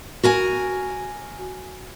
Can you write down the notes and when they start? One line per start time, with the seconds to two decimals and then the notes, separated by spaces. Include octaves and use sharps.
0.23 F#4 A#4 G#5